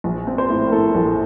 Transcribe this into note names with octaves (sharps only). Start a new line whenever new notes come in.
A#1
C4
C5
A2
A#4
A2 A4
A#1